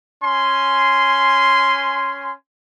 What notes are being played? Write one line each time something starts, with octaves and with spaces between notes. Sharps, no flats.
C#4 G#5 C6